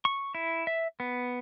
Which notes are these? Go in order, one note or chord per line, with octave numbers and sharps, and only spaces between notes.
C#6
E4
E5
B3